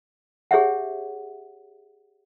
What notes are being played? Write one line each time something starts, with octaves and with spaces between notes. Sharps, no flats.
G4 G#4 C#5 E5 F#5